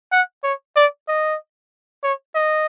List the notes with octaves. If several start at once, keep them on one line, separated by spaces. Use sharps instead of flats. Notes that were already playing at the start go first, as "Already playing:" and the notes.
F#5
C#5
D5
D#5
C#5
D#5